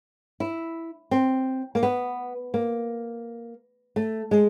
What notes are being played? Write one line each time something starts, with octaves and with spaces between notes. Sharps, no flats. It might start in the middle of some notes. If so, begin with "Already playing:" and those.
E4
C4
A#3
B3
A#3
A3
G#3